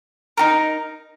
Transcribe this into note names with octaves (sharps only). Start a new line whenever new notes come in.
D#4 F#4 A#4